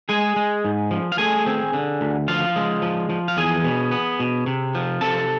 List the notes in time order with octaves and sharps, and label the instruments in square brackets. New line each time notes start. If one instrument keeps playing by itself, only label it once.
[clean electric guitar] G#3 G#4 G#5
G#3
G#2
F3
F5
A3 G#4 G#5
C4
D3
D2
F3 F4 F5
G#3
F3
F3
F5
E2 G#4 G#5
B2
B3
B2
C3
F3
C3 A4 A5